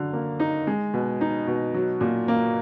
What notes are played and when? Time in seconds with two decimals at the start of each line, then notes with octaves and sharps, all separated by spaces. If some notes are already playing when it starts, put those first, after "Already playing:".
Already playing: D3 F#3
0.13 A#3
0.40 D#4
0.67 G#3
0.94 B2
1.21 D#4
1.47 B2
1.74 F#3
2.01 A#2
2.28 A#3